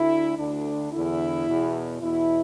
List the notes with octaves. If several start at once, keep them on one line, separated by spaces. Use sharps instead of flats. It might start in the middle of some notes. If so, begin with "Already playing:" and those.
Already playing: D2 D3 E4
D2 D3 D4
E2 D3 E4
E2 B2
E2 B2 E4